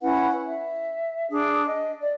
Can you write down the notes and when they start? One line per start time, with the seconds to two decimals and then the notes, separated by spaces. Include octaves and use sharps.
0.01 C#4 E4 B4 F#5
0.46 E5
1.30 D4 G#4
1.66 D#5
2.02 D5